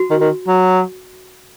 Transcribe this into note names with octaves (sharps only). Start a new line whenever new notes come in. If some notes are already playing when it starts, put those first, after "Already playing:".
Already playing: F#4
D#3
D#3
F#3